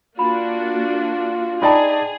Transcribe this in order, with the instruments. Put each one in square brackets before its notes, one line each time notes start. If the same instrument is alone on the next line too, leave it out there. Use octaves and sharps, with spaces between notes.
[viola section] A#3 D4 F#4 [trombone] F4 [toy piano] B5
[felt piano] D#4 D5 A5 [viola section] G#4 [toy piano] G5 B5 C6